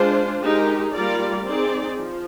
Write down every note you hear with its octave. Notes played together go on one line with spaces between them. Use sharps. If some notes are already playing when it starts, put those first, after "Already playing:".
Already playing: G#3 D4 F4 C5
G#3 D#4 G4 A#4
G3 A#3 F4 A#4 D5
C4 D#4 G#4 D5
F3